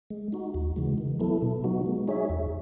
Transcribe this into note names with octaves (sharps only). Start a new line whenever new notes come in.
G#3
D#4 F#4
D#2
C#3 E3 G#3
D#3
F#3 B3 E4 A4
B2
F#3 B3 D#4 F#4
G#3
D#4 G#4 C#5 E5
E2